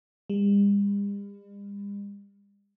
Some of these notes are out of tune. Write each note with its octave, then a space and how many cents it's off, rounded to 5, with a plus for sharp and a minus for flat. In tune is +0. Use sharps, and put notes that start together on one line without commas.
G3 +45